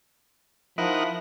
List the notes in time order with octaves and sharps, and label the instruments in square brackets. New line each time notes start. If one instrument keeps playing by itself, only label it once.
[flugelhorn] F3 [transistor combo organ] D#4 A#4 F#5 [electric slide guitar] E4